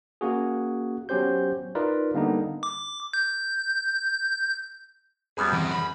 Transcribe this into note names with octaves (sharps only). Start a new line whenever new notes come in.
A#3 C#4 F#4 G#4
F#3 B3 C#4 G4 C5 G6
D#4 F4 A#4 B4 D5
D3 G3 A#3 B3 D4 D#4
D6
G6
F#2 G3 B3 G#4
E3 C4
B5